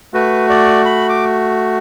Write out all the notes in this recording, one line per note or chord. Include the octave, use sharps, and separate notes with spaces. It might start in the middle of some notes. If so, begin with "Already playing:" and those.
A3 F#4 B4
D5
B5
D6